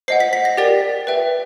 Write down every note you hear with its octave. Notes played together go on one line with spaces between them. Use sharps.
C5 D#5 F#5 C7
B6
B6
A#6
G4 A#4 D5 G5 A6
B4 E5 G5